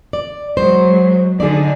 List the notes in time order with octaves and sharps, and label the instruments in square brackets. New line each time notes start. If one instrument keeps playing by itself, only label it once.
[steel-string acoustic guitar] D5
[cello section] F#3 G#3 [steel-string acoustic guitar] C5
[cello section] D3 D#4 [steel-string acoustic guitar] G#4 D5